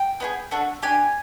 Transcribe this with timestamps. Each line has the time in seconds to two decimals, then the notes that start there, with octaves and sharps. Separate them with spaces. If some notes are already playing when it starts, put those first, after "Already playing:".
Already playing: G5
0.20 B3 E4 G#4
0.51 A3 D4 F#4 A4
0.83 D4 G4 G#5